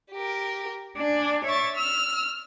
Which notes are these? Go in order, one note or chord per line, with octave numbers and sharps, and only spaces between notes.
G4 A#4
D4 D5 G#5
C#5 E5 C#6 D6 A6
E6 F6